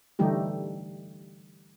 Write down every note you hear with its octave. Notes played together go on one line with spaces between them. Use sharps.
D3 E3 G3 A3 D#4 G4